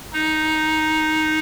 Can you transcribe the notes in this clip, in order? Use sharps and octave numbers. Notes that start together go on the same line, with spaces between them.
D#4